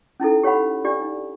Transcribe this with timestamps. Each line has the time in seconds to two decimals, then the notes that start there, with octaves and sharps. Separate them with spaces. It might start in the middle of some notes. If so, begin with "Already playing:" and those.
0.20 C#4 D#4 E4 A4
0.43 G4 C#5 F5 F#5 B5
0.85 D4 G4 D5
1.01 D#4